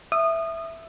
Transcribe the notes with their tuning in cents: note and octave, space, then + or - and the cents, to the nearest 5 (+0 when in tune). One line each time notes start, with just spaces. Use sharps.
E5 +0 D#6 -25